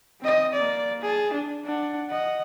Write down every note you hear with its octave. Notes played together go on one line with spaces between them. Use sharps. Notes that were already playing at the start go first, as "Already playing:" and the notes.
C4 D#5
A#3 D5
G#4 A5
D4
D4 F#5
D#5 F#5